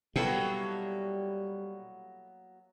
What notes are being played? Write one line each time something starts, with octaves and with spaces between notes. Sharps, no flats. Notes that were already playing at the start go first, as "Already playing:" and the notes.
B2 F#3 G3 A#3 B3 E4 A4 G5